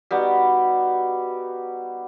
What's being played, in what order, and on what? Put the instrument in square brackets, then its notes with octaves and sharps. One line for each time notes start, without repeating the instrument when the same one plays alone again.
[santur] G3 B3 D#4 F#4